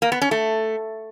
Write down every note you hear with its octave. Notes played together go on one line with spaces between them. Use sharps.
A#3
B3
C#4
A3